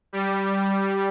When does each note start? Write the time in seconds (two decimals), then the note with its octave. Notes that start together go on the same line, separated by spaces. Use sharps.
0.13 G3